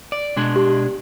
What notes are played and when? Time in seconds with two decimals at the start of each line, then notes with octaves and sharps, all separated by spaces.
0.12 D5
0.36 B2 G#3 D4
0.56 G4